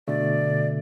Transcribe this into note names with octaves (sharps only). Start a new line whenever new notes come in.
B2 D3 A3 D5